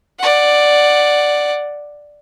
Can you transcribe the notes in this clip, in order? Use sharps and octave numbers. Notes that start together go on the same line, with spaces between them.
D5 F#5